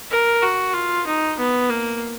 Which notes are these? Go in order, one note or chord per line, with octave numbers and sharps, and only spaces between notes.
A#4
F#4
F4
D#4
B3
A#3